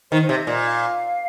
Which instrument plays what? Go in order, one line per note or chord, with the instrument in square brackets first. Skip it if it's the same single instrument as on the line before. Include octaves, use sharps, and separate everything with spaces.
[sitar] D#3 [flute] C5
[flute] C5
[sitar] C3 [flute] D#5
[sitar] A#2 [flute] D#5
[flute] F5